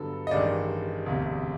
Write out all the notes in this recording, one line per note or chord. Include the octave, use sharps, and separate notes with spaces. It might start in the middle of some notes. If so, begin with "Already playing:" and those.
Already playing: G2 D3 F#3 B3 A4
D#5
A1 G2 D#3 G#3 D5
E1 D2 C3